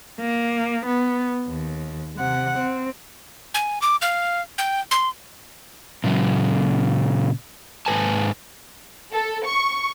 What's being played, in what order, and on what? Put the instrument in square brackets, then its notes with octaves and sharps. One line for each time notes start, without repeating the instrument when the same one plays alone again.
[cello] A#3
B3
D#2
C3 F#5
C4
[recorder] G#5
D6
F5
G5
C6
[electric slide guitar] A#2 C#3 F#3
G#2 B4 G#5 A5
[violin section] A4
C#6